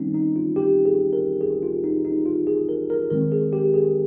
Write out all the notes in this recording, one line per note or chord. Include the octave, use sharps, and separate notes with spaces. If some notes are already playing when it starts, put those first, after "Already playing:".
Already playing: D#3 G3 C4 C#4 D#4
D#4
F4
G4
G#4
A#4
G#4
F4
D#4
D#4
F4
G#4
A#4
A#4
D#3 G#3 C4 A#4
G#4
G4
G#4